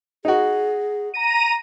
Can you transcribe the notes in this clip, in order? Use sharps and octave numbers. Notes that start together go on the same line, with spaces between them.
D#4 F#4 G#4
A#5 A#6 D#7